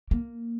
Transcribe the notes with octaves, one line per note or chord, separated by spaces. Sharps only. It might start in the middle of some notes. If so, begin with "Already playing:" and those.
A#3